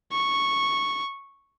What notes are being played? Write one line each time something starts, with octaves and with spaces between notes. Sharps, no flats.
C#6